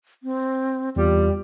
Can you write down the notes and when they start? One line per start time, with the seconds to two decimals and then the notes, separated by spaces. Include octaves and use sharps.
0.23 C4
0.96 E2 G3 F4